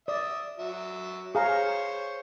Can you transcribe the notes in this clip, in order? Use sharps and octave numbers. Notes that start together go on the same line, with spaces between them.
D5 E5 D#6
F#3 E5
G#4 C5 C#5 F5 A#5